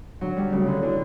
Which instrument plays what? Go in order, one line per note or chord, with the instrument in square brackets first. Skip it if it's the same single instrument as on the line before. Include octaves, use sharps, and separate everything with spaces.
[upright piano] D3 [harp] F#3
[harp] G3
[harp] C#3 [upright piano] F#3 A3 D4 F#4
[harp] D3
[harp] D3 [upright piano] E3